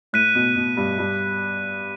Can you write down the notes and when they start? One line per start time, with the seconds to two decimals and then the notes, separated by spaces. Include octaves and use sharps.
0.13 A2 F#6 B6 D#7
0.35 B2
0.56 B2
0.77 G2
0.98 G2